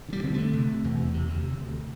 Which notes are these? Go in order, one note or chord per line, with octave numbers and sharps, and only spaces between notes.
D3
G3
D3 C4
D3 A3
C3
C3
E2
C3
C3
D2
C3
D2